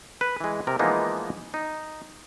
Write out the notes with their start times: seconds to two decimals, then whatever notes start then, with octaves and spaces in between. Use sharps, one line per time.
0.21 B4
0.41 E3 G#3
0.67 C3 A#4
0.79 E3 F3 G#3 A#3 B3 D#4
1.54 D#4